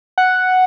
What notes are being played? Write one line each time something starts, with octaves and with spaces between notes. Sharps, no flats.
F#5